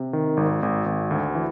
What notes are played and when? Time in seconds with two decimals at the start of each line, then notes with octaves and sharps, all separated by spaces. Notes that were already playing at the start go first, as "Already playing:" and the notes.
Already playing: C3
0.13 D#3
0.37 G#1
0.63 G#1
0.86 G#1
1.11 D2
1.35 E3